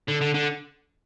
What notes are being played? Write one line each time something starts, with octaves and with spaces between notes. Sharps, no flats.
D3
D3
D3